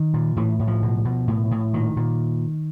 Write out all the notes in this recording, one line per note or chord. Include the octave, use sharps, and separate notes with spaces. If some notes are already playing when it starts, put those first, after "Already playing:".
Already playing: D#3
A#2
A2 E3
A2
F3
B2
B2
A2
A2
A#2 D#3
A#2